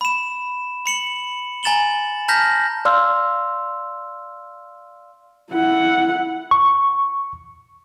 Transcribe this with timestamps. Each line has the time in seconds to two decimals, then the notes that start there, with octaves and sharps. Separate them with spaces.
0.01 B5 E7
0.86 B5 C#7 F#7
1.63 G#5 A#5 A6 E7 F#7 G7
2.28 A5 A#5 F6 G6 A#6 B6
2.85 D5 F5 C6 E6 F6
5.50 E4 F#5
6.51 C#6